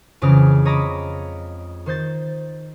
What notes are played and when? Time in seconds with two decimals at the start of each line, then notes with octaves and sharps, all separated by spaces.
0.21 F2 C#3 E3 G#3 D6 F6
0.65 C#5 D#5 A#5 B5 D6 D#6
1.86 D#3 C5 G6 A6